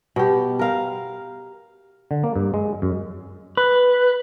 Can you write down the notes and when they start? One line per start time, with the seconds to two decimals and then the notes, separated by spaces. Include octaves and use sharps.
0.16 B2 G4
0.59 A#4 F5
2.11 D3
2.24 A#3
2.36 G2
2.54 G#3
2.82 F#2
3.57 B4